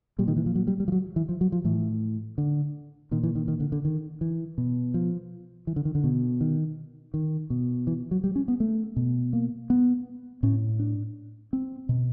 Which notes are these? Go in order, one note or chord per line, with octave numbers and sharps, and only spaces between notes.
A#2 G3
D#3
E3
F3
F#3
G3
G3
F3
F#3
E3
F3
F#3
F3
A2 E3
D3
A#2 D#3
E3
D#3
D#3
D3
D3
D#3
E3
B2
F3
E3
D3
D#3
D3
B2
D#3
D#3
B2
E3
F#3
G3
C#4
B3
A3
B2
A#3
B3
A2 C#4
D4
C4
B2